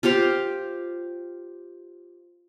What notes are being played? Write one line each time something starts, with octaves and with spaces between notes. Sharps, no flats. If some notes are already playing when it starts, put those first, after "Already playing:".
F4 G4 C5 F5